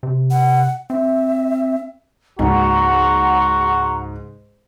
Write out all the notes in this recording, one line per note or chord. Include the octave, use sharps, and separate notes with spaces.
C3
F#5
C4 E5
C#2 G#2 A#3 F#4 F#5 A#5 C6